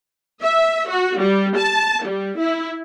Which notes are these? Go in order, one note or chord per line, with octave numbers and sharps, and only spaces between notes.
E5
F#4
G3
A5
G3
E4